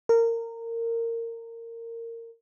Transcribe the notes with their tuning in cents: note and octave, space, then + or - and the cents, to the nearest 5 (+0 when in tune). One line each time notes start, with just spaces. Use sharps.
A#4 -20